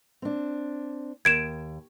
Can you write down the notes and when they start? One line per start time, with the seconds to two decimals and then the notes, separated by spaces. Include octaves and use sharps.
0.22 C4 D4
1.25 D#2 G#6 D7 E7